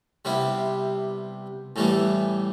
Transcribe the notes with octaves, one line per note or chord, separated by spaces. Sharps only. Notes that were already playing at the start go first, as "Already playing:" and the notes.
C3 G3 B3 E4
A2 E3 G3 B3